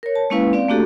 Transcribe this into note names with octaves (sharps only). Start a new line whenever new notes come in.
A#4 C#5
A5
G#3 A#3 C#4 E4 B4 F5
C4 D5 F5
A3 A#3 D4 F#4 G4 A4